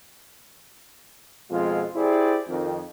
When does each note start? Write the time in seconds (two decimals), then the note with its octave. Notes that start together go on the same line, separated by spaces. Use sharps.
1.50 F2 B2 G#3 F4
1.95 E4 G4 G#4 C5 D5
2.48 F2 D#3